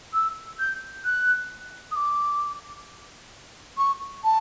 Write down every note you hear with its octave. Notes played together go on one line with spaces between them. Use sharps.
E6
G6
F#6
D#6
D6
C#6
A5